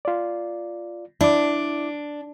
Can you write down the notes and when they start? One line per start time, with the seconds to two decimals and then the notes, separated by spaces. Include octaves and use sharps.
0.05 F4 D5
1.21 D4 E4 D6